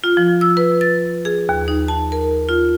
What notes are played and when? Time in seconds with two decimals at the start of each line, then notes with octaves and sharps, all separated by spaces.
0.04 F4
0.17 F3
0.41 E6
0.57 B4
0.81 A6
1.25 G#4
1.49 D#2
1.68 D#4
1.88 A5
2.12 A#4
2.49 F4